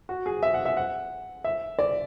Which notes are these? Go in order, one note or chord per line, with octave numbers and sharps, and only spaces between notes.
F#4
G#4
E5
F#5
E5
F#5
E5
D5